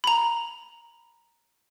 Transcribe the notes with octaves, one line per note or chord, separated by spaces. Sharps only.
A#5 B5